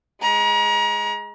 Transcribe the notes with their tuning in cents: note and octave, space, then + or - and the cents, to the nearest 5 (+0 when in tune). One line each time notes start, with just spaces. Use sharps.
G#3 +0 A#5 +35